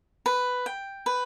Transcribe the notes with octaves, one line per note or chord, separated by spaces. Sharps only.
B4
G5
B4